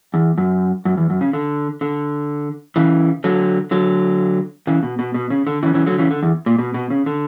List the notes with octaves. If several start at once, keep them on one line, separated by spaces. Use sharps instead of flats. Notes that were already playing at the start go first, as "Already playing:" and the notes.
E2
F#2
F#2
E2
F#2
C#3
D3
D3
C#3 E3
D3 F#3
D3 F#3
C#3 E3
B2
B2
B2
C#3
D3
C#3 E3
C#3 E3
D3 F#3
C#3 E3
D3
E2
A#2
B2
B2
C#3
D3